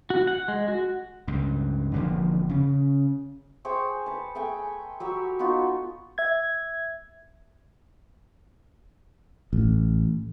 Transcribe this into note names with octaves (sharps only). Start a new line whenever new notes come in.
F#4
F#5
G#3
F#4
C#2 G2
E1 A#1 D3 F3
C#3 C#4
G#4 C5 C#5 G5
B4 A5
A3 G#4 G5 G#5
F#3 G4 C#6 E6
B3 D#4 F4 F#4
E5 G#6
A1